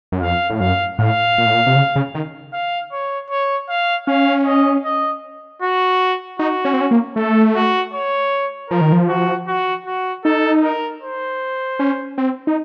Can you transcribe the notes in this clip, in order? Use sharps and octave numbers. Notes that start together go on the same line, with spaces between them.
F#2
F2 F5
A2
F#2 F5
A2 F5
A#2
A2
A#2
C3
C#3
C#3
D#3
F5
C#5
C#5
F5
C#4 F5
D#5
D#5
F#4
D#4 F#4
C#4
C4
C#4
A#3
A3 A4
F#4
C#5
F3 A#4
D#3
F3
F#4
F#4
F#4
D#4 A4
A#4
C5
C#4
C4
D#4